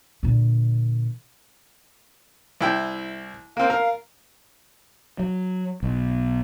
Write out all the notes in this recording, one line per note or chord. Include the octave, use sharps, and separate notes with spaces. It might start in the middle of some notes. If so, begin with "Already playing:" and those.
A#2 D3
C2 E4 G5
A#3 C4 F5
A#4
F#3
B1